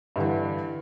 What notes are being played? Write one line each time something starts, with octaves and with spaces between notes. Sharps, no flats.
G2 D3 E3